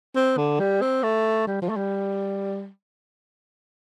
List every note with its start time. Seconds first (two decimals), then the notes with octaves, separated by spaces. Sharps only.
0.16 C4
0.37 D3
0.60 G3
0.82 C4
1.03 A3
1.47 G3
1.62 F3
1.69 A3
1.77 G3